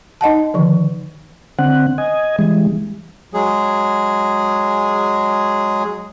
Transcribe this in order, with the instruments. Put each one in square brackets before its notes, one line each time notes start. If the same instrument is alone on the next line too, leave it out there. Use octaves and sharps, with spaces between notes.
[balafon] D#4 D#5 F#5 A5
D3 D#3 F3
[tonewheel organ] D3 C4 F#5
D#5 G#5
E3 G3 G#3
[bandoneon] F#3 G#3 G#4